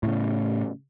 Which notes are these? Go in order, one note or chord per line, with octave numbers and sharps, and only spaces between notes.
A2 C#3